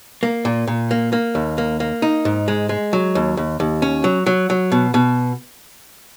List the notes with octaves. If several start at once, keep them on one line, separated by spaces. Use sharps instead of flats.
A#3
A#2
A#2
A#3
A#3
D#2
A#3
A#3
D#4
G#2
G#3
G#3
F#3
D#2
D#2
D#2
C#4
F#3
F#3
F#3
B2
B2